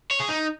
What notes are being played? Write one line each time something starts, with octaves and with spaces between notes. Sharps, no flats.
C#5
G#4
D#4